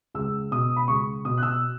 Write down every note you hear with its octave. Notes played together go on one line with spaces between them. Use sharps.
C#2 E6
B2 D#6
B5
C#2 C#6
B2 D#6
F#6
E6